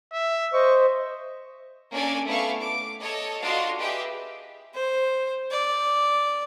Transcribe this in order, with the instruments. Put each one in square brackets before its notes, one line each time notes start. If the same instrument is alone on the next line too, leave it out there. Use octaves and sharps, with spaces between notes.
[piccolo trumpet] E5
[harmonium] C5 D#5 [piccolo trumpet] C#6
[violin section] A#3 C#4 D4 A4 D5 G#5
A3 B3 E4 F5 C#6
D6
A4 C#5 D#5
D4 F4 F#4 D#5 F5 C6
G4 G#4 B4 D#5 E5 G5
[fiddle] C5
D5